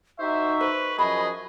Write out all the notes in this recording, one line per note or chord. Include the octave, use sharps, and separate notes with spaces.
D#4 F#4 C5 E5 C#6
B4 C5
F#2 F3 G#4 D#5 B5